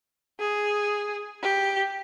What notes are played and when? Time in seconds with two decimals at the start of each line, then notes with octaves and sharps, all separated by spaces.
0.40 G#4
1.42 G4